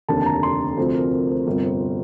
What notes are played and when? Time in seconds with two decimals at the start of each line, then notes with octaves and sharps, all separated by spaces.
0.09 F1 D#2 D3 A5
0.22 A5
0.26 A#5
0.43 C6
0.77 D2 C3 F3 C5
0.94 A#4
1.12 A#4
1.29 C5
1.46 G1 F2 C3 F3 A#4
1.63 C5